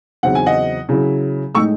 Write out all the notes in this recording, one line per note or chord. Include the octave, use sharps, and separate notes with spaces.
E2 C#3 F#3 C4 D#4 F#5
G#5
D#5 F#5
C#3 F#3 C#4 E4
A2 G#3 D#4 C#6 E6